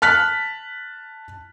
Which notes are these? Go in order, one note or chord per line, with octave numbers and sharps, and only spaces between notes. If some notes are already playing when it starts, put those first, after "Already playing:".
A5 F6 F#6 B6